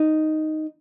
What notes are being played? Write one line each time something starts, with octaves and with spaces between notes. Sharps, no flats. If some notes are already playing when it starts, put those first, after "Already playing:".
Already playing: D#4